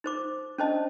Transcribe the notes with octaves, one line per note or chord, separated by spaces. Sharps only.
D#4 C5 D6
C#4 D4 C5 D#5 A5